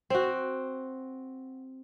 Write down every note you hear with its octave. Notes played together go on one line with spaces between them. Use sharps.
C4 F#4